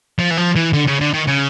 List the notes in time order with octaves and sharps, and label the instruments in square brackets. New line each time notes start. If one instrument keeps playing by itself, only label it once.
[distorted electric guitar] F3
E3
F3
E3
D3
C#3
D3
D#3
C#3